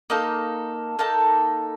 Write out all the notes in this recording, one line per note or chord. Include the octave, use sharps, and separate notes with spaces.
A#3 D#4 A4 D#5
A#3 D#4 A4 A5